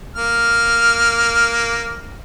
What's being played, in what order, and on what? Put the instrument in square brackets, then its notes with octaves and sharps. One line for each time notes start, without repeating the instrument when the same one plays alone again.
[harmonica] A#3 F6